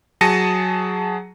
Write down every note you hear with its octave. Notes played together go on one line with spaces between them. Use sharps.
F#3 G#4 A5 A#6 C#7 D#7